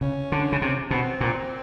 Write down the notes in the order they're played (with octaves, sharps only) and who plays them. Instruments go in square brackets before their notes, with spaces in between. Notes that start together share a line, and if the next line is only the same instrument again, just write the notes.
[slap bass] C#3 [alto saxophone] C#4
[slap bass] D3
C#3
C3
[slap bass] B2 [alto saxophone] C4
[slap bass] A#2